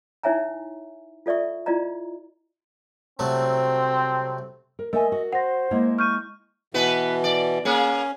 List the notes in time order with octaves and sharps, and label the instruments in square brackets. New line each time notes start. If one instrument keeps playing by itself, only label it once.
[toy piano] D#4 E4 C#5 E5 G#5 A#5
F4 A4 D5 E5 C#6
E4 F4 D5 D#5 A#5
[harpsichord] C2 F#3 A3 [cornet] C4
[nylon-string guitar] A#4
[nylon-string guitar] A3 E5 G#5 [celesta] A#4 [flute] D#5
[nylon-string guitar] F#4
[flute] C5 [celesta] F#5 A#6
[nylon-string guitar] G#3 A#3 E4
[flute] C#6 [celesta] F6 G6 D#7
[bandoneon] B2 E3 [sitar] B3 B4
[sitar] D5
[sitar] A#3 G#4 [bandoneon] C#4